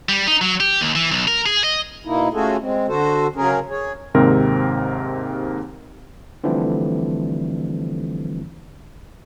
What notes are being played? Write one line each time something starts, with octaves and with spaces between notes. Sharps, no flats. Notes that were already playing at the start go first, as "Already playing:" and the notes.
G3
D#4
F#3
G4
D#2
E3
B1
A#4
G#4
D#5
B2 A#3 D#4 E4
A3 C#4 F4 F#4 G#4 A4
G#3 C4
D3 F#4 A4 C5
C#3 F#3 C#4 G#4 A#4
G#4 C#5
D#2 G#2 C3 C4 A#4
D3 E3 F3 G3 A3 C4